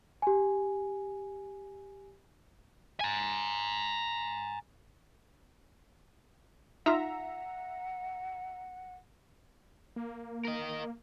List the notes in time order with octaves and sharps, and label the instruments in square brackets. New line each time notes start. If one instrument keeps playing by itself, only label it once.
[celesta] G4 G#5
[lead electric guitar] G#5 A#5
[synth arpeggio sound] D#4 F4 [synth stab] E5 A#5 [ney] F#5
[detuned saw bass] A#3
[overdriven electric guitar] A#4 D#5